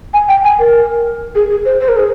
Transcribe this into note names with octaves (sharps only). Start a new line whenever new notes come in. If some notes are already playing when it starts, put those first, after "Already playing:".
G#5
G5
G#5
A#4
G#4
G#4
C5
C5
A#4
G#4